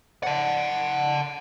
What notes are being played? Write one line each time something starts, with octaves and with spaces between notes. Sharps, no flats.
F#5 A5